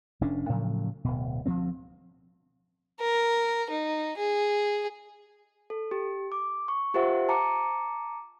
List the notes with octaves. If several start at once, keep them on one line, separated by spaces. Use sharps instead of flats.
F1 C#4 D4
A2 C#3 F3 F#3
D1 B2
D2 F3 A#3 C4
A#4
D#4
G#4
A4
G4
D6
C#6
F4 G4 A#4 C5 E5 F#5
A5 A#5 D6 C#7